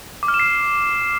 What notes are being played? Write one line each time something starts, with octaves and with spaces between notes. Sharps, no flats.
D6
F6
E7
C7